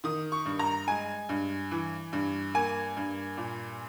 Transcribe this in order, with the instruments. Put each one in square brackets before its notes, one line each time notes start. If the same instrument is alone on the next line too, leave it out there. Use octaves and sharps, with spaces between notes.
[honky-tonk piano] D#3 D#6
C#6
G2
A#5
G#3 G#5
G2
E3
G2
A#3 G#5
G2
A#2